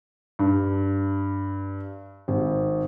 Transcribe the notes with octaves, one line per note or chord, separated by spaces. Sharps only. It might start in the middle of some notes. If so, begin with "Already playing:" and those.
G2
G#1